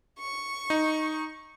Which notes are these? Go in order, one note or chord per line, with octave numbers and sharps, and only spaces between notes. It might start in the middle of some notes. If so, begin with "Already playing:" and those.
C#6
D#4